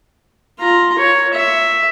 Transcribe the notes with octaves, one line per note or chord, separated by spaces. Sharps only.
F4 A#5
C#5
E5